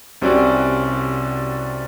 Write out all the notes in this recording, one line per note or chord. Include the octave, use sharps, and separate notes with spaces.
C2 C3 C#4 F#4 D5